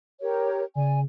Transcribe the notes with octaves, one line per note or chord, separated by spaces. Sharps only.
G4 A#4 C#5
C#3 D5 G#5